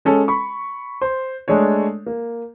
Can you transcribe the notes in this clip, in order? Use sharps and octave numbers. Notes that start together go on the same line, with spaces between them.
G#3 C#4 A4
B5 C#6
C5
G#3 A3 D4 C#5
A#3